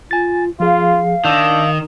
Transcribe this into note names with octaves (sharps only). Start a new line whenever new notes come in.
F4 G#5 A6
F3 F4 G#4 F5
D#3 D4 E6 G6